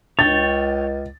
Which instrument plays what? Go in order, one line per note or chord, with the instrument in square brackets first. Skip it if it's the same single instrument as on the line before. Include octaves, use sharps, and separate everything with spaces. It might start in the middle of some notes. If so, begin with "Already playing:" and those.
[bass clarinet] C#2 [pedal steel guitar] C#5 G5 [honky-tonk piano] A6